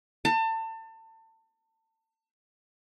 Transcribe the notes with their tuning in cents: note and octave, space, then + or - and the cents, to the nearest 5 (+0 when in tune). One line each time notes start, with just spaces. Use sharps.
A5 +30